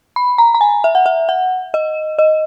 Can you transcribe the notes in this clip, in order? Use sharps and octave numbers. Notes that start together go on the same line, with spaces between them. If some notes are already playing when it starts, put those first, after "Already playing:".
B5
A#5
A#5
G#5
E5
F#5
E5
F#5
D#5
D#5